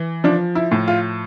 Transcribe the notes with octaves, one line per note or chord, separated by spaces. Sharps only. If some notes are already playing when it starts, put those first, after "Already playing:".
Already playing: E3
F3 D4
E4
A2
F4